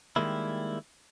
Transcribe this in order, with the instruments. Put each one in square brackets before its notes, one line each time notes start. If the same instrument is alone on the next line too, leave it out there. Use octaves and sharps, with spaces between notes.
[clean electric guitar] D#3 G3 G#3 A#3 E4